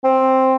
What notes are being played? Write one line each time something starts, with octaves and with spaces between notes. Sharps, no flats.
C4